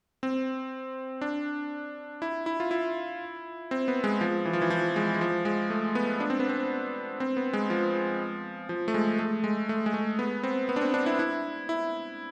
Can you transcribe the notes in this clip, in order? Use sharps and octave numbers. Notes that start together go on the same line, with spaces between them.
C4
D4
E4
E4
F4
E4
C4
B3
G#3
F3
E3
F3
E3
F3
G#3
G#3
F3
G#3
A3
B3
D4
C4
B3
C4
C4
B3
G#3
F3
F3
A3
G#3
A3
G#3
A3
G#3
A3
B3
C4
B3
D4
C4
D4
E4
E4
E4